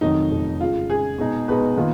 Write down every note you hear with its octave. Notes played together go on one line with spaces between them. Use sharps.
F1 F2 D#3 F#3 D#4
F1 F2 D#3 F#3
C#3 G#3 D#4 F4
C#3 G#3 D#4 G#4
B2 G#3 D#4
B2 G#3 D#4 B4
D#3 A#3 F4